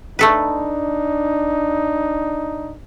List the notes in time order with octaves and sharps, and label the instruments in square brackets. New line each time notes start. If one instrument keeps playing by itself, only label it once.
[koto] A3 A4 B4 [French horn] D4 [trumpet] D#4